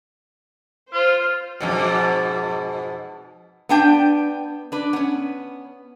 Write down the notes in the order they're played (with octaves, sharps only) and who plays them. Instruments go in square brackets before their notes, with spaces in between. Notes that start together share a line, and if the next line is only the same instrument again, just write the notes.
[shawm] F4 [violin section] C5
[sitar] F2 G#2 B2
[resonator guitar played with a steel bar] B3 D4 G5
D4 B4
B3 C#4